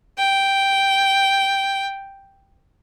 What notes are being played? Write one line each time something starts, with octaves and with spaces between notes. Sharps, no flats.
G5